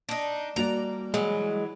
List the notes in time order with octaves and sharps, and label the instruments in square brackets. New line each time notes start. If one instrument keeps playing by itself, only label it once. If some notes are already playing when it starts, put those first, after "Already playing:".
[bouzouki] D4 D#4
[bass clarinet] G3 [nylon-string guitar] A#3 F#4 D5 [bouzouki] A#5
[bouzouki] E3 F#3 [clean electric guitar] G#3